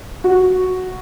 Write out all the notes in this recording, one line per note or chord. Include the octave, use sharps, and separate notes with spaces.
F#4